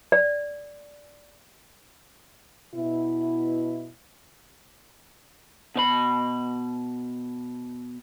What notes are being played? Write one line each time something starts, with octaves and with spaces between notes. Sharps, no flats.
D5
B2 E4
B2 C#5 B5